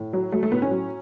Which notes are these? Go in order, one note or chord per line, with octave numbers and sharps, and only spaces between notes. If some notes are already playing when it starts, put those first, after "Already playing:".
Already playing: A2
F#3
F#3 A3
A3
A2 B3
C#4
F#3